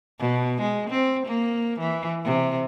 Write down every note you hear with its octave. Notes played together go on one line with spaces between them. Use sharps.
B2
G#3
C4
A#3
E3
C3